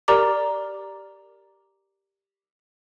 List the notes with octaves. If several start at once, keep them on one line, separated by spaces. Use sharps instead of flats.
G4 A#4 D5 A#5 D6